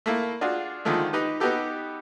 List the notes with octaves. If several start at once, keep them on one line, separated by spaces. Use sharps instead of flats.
A3 A#3 E4
D4 F4 F#4 G#4
D3 D#3 F3 G#3 A3
D#4 G4 B4
B3 D#4 F#4 G4 A4